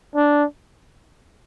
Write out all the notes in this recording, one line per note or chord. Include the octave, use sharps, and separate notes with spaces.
D4